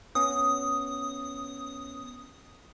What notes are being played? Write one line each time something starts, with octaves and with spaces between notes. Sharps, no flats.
B3 C#4 D#6